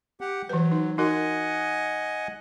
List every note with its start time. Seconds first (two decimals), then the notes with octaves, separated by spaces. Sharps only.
0.21 G4 F#5
0.49 E3 F#3 B4
0.71 D#4
0.98 D#4 F#4 A#4 D#5 F#5 G#5